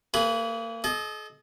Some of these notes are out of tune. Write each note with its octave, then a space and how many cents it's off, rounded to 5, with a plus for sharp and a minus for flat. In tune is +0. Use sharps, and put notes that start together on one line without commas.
A#3 -35 G#4 +0 B4 +0
A4 -45 D#5 -15